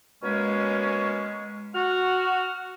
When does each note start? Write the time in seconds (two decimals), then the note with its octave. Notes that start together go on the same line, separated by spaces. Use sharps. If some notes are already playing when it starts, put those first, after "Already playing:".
0.23 B2 G#3 A#3 C#4
1.74 F#4 F6